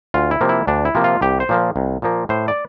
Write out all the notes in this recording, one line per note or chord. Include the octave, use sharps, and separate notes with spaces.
D2 F4
E4
C3 F3 A#3
E4
D2 D4
E4
C3 F3 A#3
F4
C2 G4
C5
A#2 F3 A#3
C2
A#2 F3 A#3
A2 C5
D5